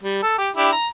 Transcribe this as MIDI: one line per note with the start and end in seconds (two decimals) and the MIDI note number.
0.03 0.22 55
0.23 0.38 69
0.38 0.49 67
0.56 0.71 62
0.56 0.71 64
0.56 0.71 67
0.72 0.86 82